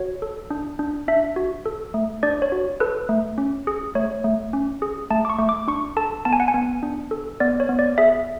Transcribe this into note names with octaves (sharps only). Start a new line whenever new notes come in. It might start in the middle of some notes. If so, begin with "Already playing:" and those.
Already playing: F#4 C#5
A4
D4
D4
D4 E5
F#4
A4
A3
D4 D5
C#5
F#4
A4 B4
A3
C#4
G#4
A3 C#5
A3
C#4
G#4
A3 A5
D6
C#6
A3
D6
D4 C#6
A4 A5
B3 A5
G#5
F#5
G#5
B3
D4
A4
B3 D5
C#5
B3
D5
G#4 E5